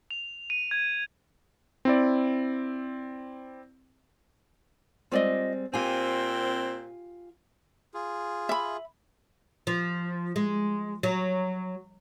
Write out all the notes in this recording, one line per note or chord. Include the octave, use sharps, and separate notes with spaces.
F7
D#7
G#6
C4 E4 D5
G3 G#3 C4 F4 D5 D#5
A#2 C4 F4 G4 G#5
F4 G#4
E5 B5
F3
G#3
F#3